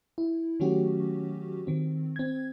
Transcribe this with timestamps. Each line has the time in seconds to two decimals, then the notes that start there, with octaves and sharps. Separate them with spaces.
0.18 E4
0.60 D#3 F#3 A3 C#4 F#4 G4
1.67 D#3 C4
2.16 C4 G#6